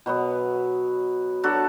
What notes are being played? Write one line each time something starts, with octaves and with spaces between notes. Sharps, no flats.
B2 F#3 B3
F#3 D4 F#4 A4